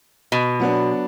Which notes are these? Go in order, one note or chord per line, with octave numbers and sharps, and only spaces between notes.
B2
F#3 B3 D4